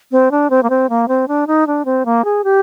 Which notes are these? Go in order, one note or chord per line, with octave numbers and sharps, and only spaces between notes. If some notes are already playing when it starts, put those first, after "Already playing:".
C4
D4
C4
A#3
C4
A#3
C4
D4
D#4
D4
C4
A#3
G#4
G4